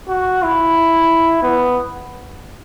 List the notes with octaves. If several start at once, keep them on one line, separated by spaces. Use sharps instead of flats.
F#4
E4
B3